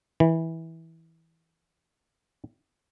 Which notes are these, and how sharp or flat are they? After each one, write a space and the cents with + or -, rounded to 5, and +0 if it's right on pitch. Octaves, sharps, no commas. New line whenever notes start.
E3 -15